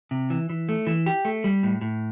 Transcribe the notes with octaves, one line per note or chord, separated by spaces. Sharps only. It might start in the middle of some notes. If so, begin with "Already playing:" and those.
C3
E3
E3
A3
E3
G4
A3
G3
A2
A2